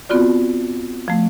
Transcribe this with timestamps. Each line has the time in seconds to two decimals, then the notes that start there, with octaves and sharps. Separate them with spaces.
0.09 B3 C4 F4 F#4 D5
1.08 F3 A3